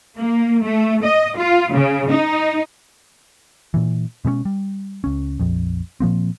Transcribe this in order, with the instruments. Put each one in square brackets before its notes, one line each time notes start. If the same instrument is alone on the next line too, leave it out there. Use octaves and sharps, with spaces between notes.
[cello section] A#3
A3
D#5
F4
C#3
D#4
[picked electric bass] A#2 E3
B2 G#3 A#3 C#4
G3
C#2 C#4
A#1 F2
A#2 F3 A#3 C4